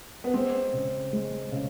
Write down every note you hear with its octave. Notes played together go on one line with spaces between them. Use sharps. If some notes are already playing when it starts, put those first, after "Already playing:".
B3
G#3 C4
C#3
G#3
C#3